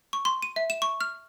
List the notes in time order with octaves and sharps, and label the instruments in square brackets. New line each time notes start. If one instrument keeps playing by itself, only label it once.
[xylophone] C#6
C6
D#7
E5
E7
C#6
F6